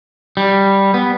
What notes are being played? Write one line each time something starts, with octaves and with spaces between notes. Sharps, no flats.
G3
B3